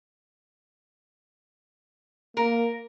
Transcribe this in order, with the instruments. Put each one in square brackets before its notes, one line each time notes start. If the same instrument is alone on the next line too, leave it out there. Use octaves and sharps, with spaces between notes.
[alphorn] A#3 [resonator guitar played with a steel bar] A#4